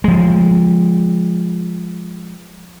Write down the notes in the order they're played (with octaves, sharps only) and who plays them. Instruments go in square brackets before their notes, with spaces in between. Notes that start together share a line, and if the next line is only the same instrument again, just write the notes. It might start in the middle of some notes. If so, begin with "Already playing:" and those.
[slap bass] F3 G#3